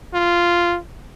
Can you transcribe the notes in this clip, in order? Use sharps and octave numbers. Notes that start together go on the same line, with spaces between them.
F4